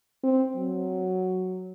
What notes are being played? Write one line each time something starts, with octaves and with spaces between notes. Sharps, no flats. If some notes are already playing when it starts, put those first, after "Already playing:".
C4
F#3